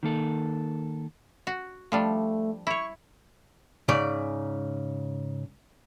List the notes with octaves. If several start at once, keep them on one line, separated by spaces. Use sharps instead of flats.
D#3 A#3 A4
F#4
F3 G3 A3 D4
E4 C#5 C#6
G#2 C#3 D5